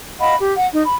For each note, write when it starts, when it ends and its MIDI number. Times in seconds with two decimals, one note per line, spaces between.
0.20 0.35 75
0.20 0.35 77
0.20 0.35 78
0.20 0.35 83
0.40 0.53 67
0.56 0.67 78
0.73 0.81 63
0.86 0.94 83